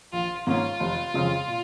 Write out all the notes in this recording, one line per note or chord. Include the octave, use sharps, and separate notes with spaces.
A#1 F4
G#2 F3 A#3 C#4 F4
F1
F2 C#3 G#3
A#2